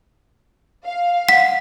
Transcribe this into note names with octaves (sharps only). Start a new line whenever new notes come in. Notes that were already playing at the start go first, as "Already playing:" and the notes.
F5
F#5 B6